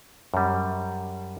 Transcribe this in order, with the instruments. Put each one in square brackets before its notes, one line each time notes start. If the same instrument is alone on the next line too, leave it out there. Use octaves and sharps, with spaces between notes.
[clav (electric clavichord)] F#2 G3